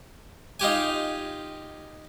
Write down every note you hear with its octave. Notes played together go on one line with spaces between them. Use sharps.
D#4 F4 G4 G#5